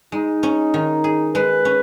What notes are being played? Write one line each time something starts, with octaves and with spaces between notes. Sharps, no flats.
G#3 D#4
C#4
D#3
G#4
G#3 B4
C#4